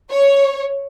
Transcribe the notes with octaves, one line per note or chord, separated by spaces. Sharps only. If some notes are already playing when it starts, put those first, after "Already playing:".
C#5